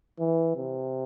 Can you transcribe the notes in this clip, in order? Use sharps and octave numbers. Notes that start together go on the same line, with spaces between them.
E3
C3